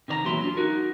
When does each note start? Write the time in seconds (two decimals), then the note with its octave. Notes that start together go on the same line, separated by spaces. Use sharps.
0.08 C3 D#3 C#5 A#5
0.25 E2 A#2 F#3 E4 C6
0.44 D4 F4
0.57 D#4 F#4 A#4